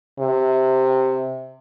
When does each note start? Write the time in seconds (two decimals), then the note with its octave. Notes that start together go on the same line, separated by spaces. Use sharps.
0.20 C3